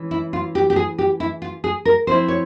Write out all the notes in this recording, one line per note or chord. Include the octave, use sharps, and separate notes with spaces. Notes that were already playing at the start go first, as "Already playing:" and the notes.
Already playing: E3 G#3 C#4
E4
F4
G4
G4
G#4
G4
E4
F4
G#4
A#4
F3 C4 E4 C5
C#5